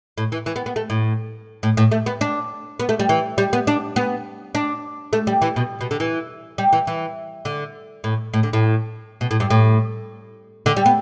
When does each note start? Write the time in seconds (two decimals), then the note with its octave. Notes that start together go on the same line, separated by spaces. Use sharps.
0.18 A2
0.32 E3
0.46 E3
0.56 B3
0.66 B3
0.76 A3
0.90 A2
1.63 A2
1.77 A2
1.92 A3
2.06 B3
2.21 D4
2.80 B3
2.89 A3
2.99 G3
3.09 E3
3.38 G3
3.53 B3
3.67 D4
3.96 B3
4.55 D4
5.13 A3
5.27 G3
5.42 E3
5.56 B2
5.81 B2
5.91 D3
6.00 E3
6.58 G3
6.73 E3
6.87 E3
7.45 D3
8.04 A2
8.34 A2
8.43 D3
8.53 A2
9.21 B2
9.31 A2
9.40 G2
9.50 A2
10.66 D3
10.76 G3
10.86 B3